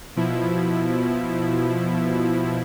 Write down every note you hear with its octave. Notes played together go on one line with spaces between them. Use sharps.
B2 F3 E4